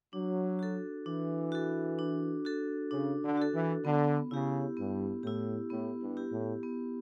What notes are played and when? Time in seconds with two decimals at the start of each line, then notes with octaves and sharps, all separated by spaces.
0.13 F#3 D4
0.59 F#4 A4
1.06 E3 D4
1.52 F#4 A4
1.99 D4
2.45 F#4 A4
2.91 C#3 D4
3.22 D3
3.37 F#4 A4
3.53 E3
3.84 D3 B3
4.31 C#3 E4 G4
4.77 G2 B3
5.23 A2 E4 G4
5.70 A2 B3
6.01 G2
6.17 E4 G4
6.31 A2
6.63 B3